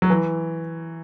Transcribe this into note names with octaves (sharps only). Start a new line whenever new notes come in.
F#3
E3